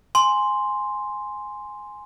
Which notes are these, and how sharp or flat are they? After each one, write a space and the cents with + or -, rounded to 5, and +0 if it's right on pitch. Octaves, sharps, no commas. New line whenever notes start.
G#5 +0 C6 +0